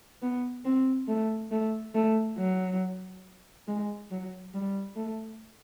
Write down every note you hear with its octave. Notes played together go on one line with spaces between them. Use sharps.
B3
C4
A3
A3
A3
F#3
G#3
F#3
G3
A3